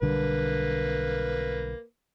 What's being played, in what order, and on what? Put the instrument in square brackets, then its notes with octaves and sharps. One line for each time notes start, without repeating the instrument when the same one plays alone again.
[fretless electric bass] B1 D3 G3 [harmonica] A#3 B4